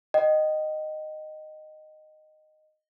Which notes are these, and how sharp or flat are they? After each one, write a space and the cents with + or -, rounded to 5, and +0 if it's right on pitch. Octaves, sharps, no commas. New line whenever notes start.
D#5 -10 G5 -35